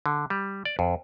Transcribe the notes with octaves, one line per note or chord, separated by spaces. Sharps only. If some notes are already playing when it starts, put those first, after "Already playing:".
D3
G3
D5
F2